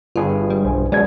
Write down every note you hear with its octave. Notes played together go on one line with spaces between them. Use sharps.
G1 G2 F4 G#4
G3
B1 C5 G#5
B1
F#2 B2 G#3 D5 G#6